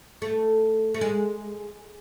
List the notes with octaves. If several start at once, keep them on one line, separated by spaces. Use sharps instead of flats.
A3
A3
G#3